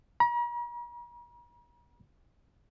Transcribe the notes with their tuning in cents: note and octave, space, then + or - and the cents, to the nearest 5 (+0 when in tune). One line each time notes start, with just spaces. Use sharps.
A#5 +45